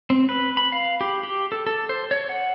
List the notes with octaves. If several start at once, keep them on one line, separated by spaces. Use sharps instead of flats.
C4
B4
B5
F5
G4
G4
A4
A4
C5
C#5
F#5